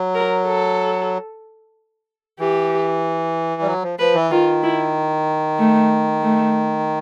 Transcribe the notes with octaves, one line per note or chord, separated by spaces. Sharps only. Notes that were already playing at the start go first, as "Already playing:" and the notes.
Already playing: F#3
A#4
A4
E3 G4
G3
F#3
F3
F3 B4
E3
D#3 F4
E4
A3
A3